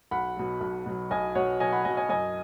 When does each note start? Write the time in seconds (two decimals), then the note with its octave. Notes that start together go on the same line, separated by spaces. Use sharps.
0.11 B1 F#5 B5
0.36 B2 F#3
0.61 B1
0.86 B2 F#3
1.11 B1 D#5 G#5
1.35 B2 C#5 F#5
1.39 F#3
1.60 B1 D#5 G#5
1.72 F#5 B5
1.85 B2 F#3 D#5 G#5
1.97 D#5 G#5
2.09 F#2 D#5 G#5